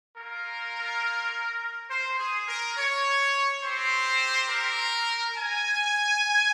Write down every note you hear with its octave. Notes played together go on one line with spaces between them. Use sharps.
A#3 F4 A#4
C5
G#4
A#4
C#5
C4 G4 C5
A#4
G#5